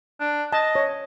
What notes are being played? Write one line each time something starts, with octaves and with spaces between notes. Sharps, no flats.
D4
D#5 A5
C#5